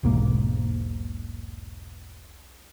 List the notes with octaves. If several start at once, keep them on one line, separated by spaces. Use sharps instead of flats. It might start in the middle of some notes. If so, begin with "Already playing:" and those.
E1 B1 G#2 A#3